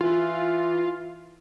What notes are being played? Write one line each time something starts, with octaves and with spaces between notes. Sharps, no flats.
E3 F4